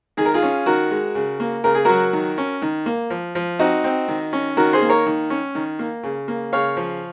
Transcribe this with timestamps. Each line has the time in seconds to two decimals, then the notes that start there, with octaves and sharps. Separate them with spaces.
0.17 D#3 G#4
0.25 A#4
0.34 F4 G#4
0.43 C#4
0.66 D#3 F#4 A#4
0.91 G#3
1.15 C#3
1.40 A#3
1.64 C#3 A#4
1.75 G#4
1.85 F#3 F#4 A#4
2.13 D#3
2.38 C#4
2.62 D#3
2.86 A#3
3.10 F3
3.35 F3
3.59 C4 D#4 F#4
3.84 C4
4.08 D#3
4.33 C#4
4.57 D#3 F#4 A#4
4.73 G#4 C5
4.82 A#3
4.89 A#4 C#5
5.06 D#3
5.30 C#4
5.55 D#3
5.79 A#3
6.03 C#3
6.28 A#3
6.53 C#3 C#5 F5
6.77 F3